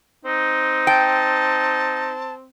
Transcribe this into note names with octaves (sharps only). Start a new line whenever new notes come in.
C4 D#4
G5 A5